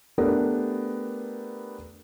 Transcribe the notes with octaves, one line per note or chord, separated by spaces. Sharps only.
A3 B3 D4 G4 A#4